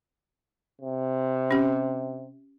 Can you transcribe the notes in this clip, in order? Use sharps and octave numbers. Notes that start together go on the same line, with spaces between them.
C3
C#4 G4